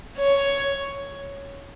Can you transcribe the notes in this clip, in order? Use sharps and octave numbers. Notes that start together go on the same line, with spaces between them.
C#5